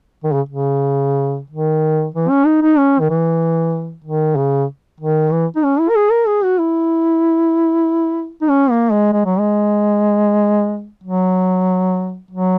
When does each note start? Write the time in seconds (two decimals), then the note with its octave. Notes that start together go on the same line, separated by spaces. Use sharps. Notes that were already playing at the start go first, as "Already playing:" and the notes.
0.24 D#3
0.33 C#3
0.49 C#3
1.50 D#3
2.15 E3
2.29 C#4
2.46 D#4
2.62 D#4
2.78 C#4
3.00 D#3
3.10 E3
4.05 D#3
4.36 C#3
5.01 D#3
5.32 E3
5.56 D#4
5.64 C#4
5.80 E4
5.89 A#4
5.96 G#4
6.11 A#4
6.27 G#4
6.44 F#4
6.59 E4
8.42 D#4
8.50 C#4
8.70 A#3
8.92 G#3
9.13 G#3
9.26 F#3
9.39 G#3
11.04 F#3
12.31 F#3